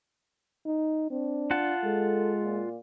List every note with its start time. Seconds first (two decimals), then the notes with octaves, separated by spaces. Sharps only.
0.66 D#4
1.11 C4 D4
1.51 F4 F#5 A5
1.84 G#3 A4
2.42 A#2